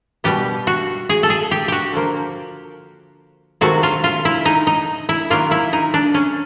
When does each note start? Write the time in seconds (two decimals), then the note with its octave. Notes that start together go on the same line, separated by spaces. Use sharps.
0.24 B2 G3 B3 G4
0.67 F#4
1.09 G#4
1.23 A4
1.30 G#4
1.51 G4
1.68 F#4 G4
1.93 D3 F3 A#3
3.61 C3 D#3 F#3 A3 F#4
3.83 F4
4.04 F4
4.25 E4
4.45 D#4
4.67 D#4
5.09 E4
5.30 D#3 F#3 A#3 F4
5.51 E4
5.73 D#4
5.94 D4
6.14 C#4